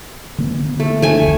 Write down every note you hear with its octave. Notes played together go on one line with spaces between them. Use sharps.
D3 A#3 B3
A3
D3 F3 A3 G#5
F1 D2